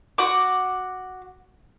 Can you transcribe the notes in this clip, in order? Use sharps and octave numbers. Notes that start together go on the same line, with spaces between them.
F#4 F#5 D6